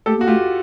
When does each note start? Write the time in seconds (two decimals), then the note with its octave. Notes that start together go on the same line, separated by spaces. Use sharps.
0.06 A3 G4 A4
0.17 A#3 F#4
0.27 A3 F4 G4